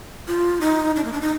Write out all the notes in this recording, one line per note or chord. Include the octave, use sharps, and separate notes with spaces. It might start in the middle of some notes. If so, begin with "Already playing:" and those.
F4
D#4
D4
A#3
D4
D#4